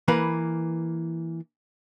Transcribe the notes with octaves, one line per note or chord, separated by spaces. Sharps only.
E3 A#3 B4